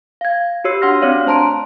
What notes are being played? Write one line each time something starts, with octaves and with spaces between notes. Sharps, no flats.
F5 G#6
F#4 G4 C#5 E6 C7
D4 F#5 C6 F6 A#6
C4 D4 C#5 D5 F5
A3 C5 A5 A#5 C6 D7